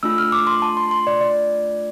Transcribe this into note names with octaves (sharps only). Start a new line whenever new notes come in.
A3 D4 F4 E6
F6
D6
C6
A5
C6
C6
D5
D5